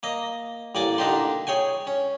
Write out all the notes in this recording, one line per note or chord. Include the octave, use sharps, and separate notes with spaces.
A#3 D#5
A1 A#3 D5 G#5 D6
D3 A#3 D4 D#4 G4 C6
G#4 C#5 G5 G#5
C#4